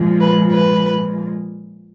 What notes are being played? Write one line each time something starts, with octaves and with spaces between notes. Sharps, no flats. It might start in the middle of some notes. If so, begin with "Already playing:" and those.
Already playing: A#2 F3 G#3
B4
B4